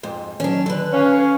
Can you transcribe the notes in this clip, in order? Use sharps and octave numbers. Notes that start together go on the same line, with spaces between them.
F2 G#2
D#3 F#3 C#4 D4
D3 B4
C#4 F5 G#5